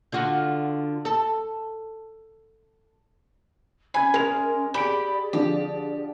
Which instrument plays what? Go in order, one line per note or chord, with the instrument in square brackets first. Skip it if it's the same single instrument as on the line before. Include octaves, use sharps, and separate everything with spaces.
[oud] D3 F4 F#4
A4
[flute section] C#4 [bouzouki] G#5 [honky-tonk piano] B5 G#6
[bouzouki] G#3 [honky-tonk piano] A#4 F7
[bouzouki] G4 [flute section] G#4 D5 [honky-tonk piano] B5 D7
[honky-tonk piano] D3 F3 [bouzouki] G4